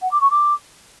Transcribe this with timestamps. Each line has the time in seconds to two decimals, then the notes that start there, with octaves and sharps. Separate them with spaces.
0.01 F#5
0.11 D6
0.21 C#6
0.30 D6